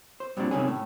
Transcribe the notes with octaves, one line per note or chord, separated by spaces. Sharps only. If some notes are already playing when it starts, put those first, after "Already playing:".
C5
G2 A#2 F#3 C4 D4
C3 D#3 C#4 G#4
A2